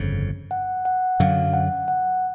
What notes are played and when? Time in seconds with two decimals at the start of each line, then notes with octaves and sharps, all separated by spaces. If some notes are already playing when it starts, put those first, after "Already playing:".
Already playing: G1 F2 C#3
0.51 F#5
0.85 F#5
1.20 F#2 D3 F#3 F5
1.53 F#5
1.88 F#5